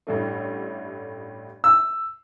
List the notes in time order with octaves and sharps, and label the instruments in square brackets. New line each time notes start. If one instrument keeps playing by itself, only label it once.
[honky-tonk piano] A1 G2 A3
[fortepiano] E6